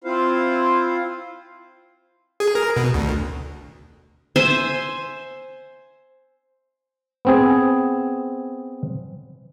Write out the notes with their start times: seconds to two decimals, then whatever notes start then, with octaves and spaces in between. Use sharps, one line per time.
0.04 C4 E4 F4 C5 F5
2.40 G#4
2.55 A#4
2.77 B2
2.94 D2
4.36 C5 E5 G#5
7.25 B3 C4 G#4